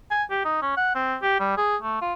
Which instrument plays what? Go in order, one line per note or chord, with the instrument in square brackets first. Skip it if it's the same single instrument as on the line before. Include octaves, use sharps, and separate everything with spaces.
[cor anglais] G#5
G4
D#4
C#4
F#5
C4
G4
G3
G#4
A3
F4